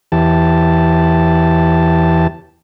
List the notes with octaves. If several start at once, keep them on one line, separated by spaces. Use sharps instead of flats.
E2 E3 G4 A5